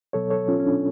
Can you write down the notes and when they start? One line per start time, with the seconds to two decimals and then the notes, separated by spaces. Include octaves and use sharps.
0.13 B2 F#3 B3 A4 C#5
0.31 A4 C#5
0.48 C#4 F4
0.60 C#4
0.65 D4